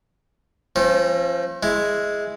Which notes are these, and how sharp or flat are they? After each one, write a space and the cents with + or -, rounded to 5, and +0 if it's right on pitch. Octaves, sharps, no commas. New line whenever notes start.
F3 -25 C4 +45
G#3 +0 E4 +0